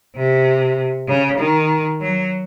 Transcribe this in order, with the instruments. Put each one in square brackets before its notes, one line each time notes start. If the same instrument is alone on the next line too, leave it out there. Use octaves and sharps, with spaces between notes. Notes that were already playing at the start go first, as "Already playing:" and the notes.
[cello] C3
C#3
D#3
F#3